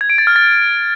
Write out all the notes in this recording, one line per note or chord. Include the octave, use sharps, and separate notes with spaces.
G#6
D7
A6
F6
A6